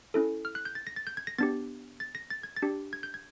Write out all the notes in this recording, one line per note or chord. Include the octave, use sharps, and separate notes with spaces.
C#4 E4 A4
F6
F#6
G6
A6
A#6
A6
G6
G#6
A#6
B3 D4 G4 A6
A6
A#6
A6
G#6
A6
D4 G4
G#6
G6
G#6